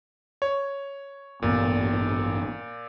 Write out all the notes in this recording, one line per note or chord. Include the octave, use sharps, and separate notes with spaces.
C#5
A1 G2 A#2 B3